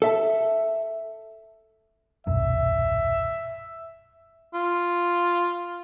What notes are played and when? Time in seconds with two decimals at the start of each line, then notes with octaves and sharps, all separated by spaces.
0.02 A4 E5 A5
2.27 D#1 B1 F#2 E5
4.54 F4